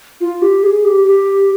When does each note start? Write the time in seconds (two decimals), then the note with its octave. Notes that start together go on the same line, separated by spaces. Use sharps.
0.21 F4
0.42 G4
0.63 G#4
0.85 G4
1.05 G4